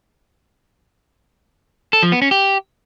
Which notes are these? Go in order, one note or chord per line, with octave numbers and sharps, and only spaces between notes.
A4
F3
B3
C#4
G4